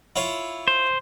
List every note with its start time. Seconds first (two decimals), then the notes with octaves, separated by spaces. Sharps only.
0.16 E4 F4 C#5
0.68 C5